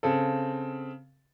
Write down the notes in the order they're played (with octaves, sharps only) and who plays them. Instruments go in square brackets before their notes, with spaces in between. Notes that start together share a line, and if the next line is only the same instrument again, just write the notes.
[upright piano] C#3 C4 A4